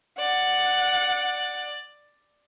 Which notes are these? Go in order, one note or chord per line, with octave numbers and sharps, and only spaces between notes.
D5 F#5